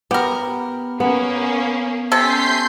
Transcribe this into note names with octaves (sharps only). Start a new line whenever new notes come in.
B3 G4 A#4
A#3 B3 C#4
C3 C#4 A4 C6 G6 B6 C7